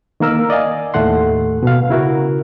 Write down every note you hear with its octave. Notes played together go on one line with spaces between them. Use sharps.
D#3 A#3 A#4 E6
D5 D#5 F5 G#5
D#2 A2 A3 F#5 C6
B2 F5
C#3 E4 F#4 A#4